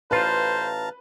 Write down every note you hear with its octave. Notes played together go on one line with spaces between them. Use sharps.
A1 F4 B4 C5 F5 A5 A#5